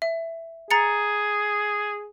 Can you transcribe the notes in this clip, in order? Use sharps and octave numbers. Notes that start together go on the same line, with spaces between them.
E5
G#4 A#5 A6 C#7